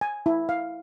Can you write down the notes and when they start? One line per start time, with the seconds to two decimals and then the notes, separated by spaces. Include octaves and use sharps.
0.01 G#5
0.26 E4
0.49 F5